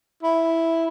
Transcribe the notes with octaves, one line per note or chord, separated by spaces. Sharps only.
E4